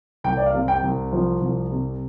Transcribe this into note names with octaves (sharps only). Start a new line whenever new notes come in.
C2 G5
D5
F5
C3
G5
C2
F3
C2
C3